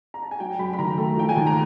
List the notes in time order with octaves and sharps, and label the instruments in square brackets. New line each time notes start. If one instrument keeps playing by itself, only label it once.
[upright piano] A#5
A5
G#5
F#3 G5
F#2 B5
B5
D#3 A#5
A3
F3 G5
G#5
D#2 A5
A#5